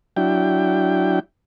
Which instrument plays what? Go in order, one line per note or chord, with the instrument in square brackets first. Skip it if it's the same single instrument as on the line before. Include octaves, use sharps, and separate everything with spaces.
[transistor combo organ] F#3 D4 E4 G5